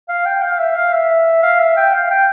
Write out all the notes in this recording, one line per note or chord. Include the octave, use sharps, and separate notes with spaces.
F5
G5
F5
E5
F5
E5
F5
E5
G5
F5
G5